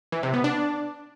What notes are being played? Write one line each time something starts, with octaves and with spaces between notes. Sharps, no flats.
E3
C3
B3
D4